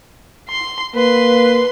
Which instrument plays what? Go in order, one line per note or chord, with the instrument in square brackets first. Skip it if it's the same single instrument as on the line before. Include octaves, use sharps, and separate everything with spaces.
[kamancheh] C6
[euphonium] A#3 [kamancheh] B4 C6